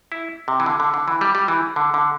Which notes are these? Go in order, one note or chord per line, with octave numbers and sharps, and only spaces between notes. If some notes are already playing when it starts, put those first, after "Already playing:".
E4
C3
E3
D3
D3
D3
E3
G3
G3
E3
D3
D3